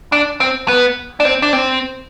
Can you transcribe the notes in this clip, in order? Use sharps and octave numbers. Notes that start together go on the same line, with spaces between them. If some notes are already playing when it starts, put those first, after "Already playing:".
D4
C4
B3
D4
C4
D4
C4